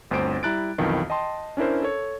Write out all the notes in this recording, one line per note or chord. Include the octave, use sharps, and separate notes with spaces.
G1 D2 C4 C5 D7
G3 E4 A#5 F#6 A6 D7
B1 F2 D#3 E3
D#5 G5 A5 C6
C#4 D4 E4 A#4 C5
A4 C#5